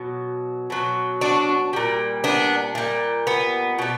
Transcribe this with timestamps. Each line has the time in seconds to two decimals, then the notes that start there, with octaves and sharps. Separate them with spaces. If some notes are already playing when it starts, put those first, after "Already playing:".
Already playing: B2 F#3
0.70 B2 F#3
1.21 D4 F#4
1.73 A#2 G3
2.24 B3 D4
2.75 A#2 G3
3.27 B3
3.79 B2 G3